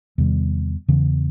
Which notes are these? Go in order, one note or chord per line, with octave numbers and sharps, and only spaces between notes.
E2 C3 D#3 G3
E2 C#3 E3